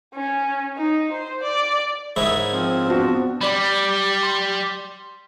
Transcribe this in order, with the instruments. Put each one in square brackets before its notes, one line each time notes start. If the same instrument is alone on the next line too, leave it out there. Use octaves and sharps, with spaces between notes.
[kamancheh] C#4
D#4
C5
D5
[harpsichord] G#2 C#4 E4 [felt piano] A#4 D#6 E6 [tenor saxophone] E5
[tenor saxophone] F3 [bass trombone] C4
[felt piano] B3 D4 F#4
[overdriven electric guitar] G3 [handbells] D5 B5
[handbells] C6